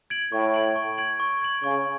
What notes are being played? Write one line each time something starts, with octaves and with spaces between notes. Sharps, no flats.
G#6 D7 F#7
A2 C#6
G#6 D7 F#7
C#6
G#6 D7 F#7
C#6
G#6 D7 F#7
C#3 C#6